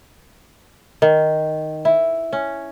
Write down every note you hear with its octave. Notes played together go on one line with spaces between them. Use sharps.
D#3
E4
C#4